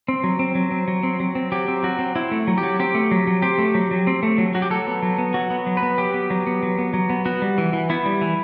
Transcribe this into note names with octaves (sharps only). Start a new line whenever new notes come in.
C4
F#3
C4
F#3
C4
F#3
C4
F#3
C4
F#3 G4
C4
F#3 F#4
C4
C4 E4
A3
F#3
G4
F#3
C4 G4
A3
F#3
F#3
C4 G4
A3
F#3
F#3
C4
A3
F#3
F#3 F#4
G4
F#3 A4
B3
F#3
B3
F#3 F#4
B3
F#3
B4
B3
F#3 G4
B3
F#3
B3
F#3
B3
F#3
B3
B3 F#4
G3
E3
E3
B3 E4
G3
E3